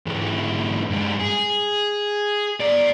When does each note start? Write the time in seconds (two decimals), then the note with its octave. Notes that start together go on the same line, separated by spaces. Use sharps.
0.06 G#2 E3
0.90 G2 G#3
1.20 G#4
2.61 D5 A#5